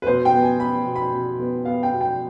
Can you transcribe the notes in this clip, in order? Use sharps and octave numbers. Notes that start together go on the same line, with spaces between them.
B4
B2 C5
G5
B3
G#5
B3 B5
B2
B5
B2
B3
B3 F5
G5
B2
G5